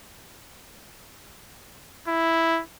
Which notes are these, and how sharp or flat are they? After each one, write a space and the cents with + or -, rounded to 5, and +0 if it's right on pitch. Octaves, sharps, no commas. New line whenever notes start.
E4 +0